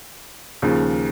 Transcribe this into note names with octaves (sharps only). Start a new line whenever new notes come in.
D#2 C#3 F3